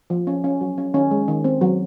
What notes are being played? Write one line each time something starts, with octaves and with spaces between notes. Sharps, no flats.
F3
C#4
C#4
F#3
C#4
D#3 C#4
G#3
D#3
C4
F#3